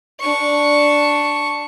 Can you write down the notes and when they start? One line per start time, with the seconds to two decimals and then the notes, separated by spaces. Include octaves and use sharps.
0.20 D4 C#6